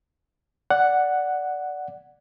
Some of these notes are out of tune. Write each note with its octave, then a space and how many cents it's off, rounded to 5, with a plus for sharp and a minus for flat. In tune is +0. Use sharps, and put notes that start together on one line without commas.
D5 -5 F#5 +0